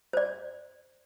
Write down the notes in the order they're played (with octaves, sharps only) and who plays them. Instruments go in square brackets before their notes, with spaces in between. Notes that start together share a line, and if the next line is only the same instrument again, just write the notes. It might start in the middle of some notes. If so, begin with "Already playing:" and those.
[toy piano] C5 D5